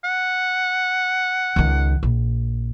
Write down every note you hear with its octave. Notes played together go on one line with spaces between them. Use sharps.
F#5
C#2 D#3
A#1